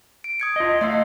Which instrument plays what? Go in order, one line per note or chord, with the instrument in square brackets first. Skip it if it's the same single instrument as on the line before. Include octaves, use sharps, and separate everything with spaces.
[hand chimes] D7
D#6 G#6 C#7
[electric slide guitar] F4 D#5
[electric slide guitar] A3 D5 F5 [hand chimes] D#5 C6 E6